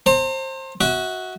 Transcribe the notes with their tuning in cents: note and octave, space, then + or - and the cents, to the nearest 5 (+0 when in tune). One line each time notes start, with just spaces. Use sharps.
C5 +25 A#5 -40
F#4 +0 E5 -35